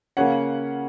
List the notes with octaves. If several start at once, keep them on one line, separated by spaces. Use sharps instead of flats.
C#3 A#3 C#4 F#5